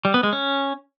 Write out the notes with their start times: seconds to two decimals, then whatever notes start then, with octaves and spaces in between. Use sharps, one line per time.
0.05 G3
0.14 B3
0.23 G#3
0.33 C#4